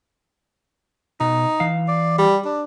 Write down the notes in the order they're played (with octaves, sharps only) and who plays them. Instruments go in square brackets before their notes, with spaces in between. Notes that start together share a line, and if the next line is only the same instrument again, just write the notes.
[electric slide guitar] B2 [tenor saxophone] D#4
[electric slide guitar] E3 F5
[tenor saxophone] D5
G3
D4